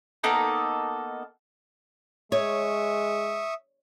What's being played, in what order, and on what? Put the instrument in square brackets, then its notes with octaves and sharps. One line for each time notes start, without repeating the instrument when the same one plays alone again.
[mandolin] A#3 B3 D#4 A4
[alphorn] G#3 [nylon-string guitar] C#5 [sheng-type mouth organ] E5 C#6 D#6